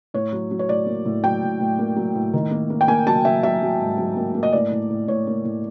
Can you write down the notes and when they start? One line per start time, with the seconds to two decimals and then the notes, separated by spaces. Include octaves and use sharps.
0.14 A2 C#5
0.32 F#3
0.51 F#3
0.59 C#5
0.69 A2 D5
0.86 A#3
1.06 A2
1.23 F#3 G5
1.43 A2
1.60 A2
1.79 A#3
1.97 F#3
2.15 A2
2.33 D#3
2.51 A#3
2.70 A#3
2.81 G5
2.88 A#3 G#5
3.07 F#3 A5
3.25 F#3 E5
3.43 F#3 E5
3.62 F#3
3.80 G#2
3.98 F#3
4.17 A#3
4.34 A#3
4.43 D#5
4.53 A2 D5
4.72 A2
4.90 A2
5.08 A2 C#5
5.27 A#3
5.45 A2